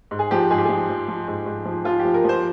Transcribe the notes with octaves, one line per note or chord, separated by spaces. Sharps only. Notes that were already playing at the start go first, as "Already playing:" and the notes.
G#2
G#4
F3 G4
G#2 G#4
G4
F3 G#4
F3
F3
G#2
G#2
F3
F3 F4
G4
F3
A#4
F3 C5